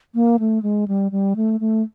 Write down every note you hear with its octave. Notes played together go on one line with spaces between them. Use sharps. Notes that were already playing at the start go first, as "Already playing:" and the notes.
A#3
A3
G#3
G3
G3
A3
A3